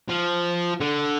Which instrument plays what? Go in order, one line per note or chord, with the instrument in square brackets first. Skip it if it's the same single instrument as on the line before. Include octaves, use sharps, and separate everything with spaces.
[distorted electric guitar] F3
D3